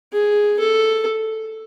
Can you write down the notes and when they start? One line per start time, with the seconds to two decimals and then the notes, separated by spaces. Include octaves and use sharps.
0.13 G#4
0.59 A4